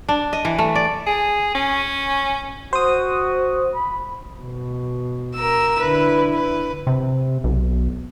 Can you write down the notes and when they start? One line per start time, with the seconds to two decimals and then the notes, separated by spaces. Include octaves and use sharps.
0.09 D4
0.33 D#5
0.45 E3
0.59 A3
0.75 D5
1.06 G#4
1.55 C#4
2.73 F#4 C5 D#6
3.75 B5
4.40 B2
5.36 A#4 E6
5.80 D3 E4 B4
6.35 B4
6.87 C3
7.44 B1